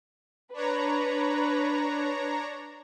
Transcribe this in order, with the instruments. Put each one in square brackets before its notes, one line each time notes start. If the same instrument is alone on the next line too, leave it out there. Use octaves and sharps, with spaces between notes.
[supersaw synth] D4 C#5 A#5 [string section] B4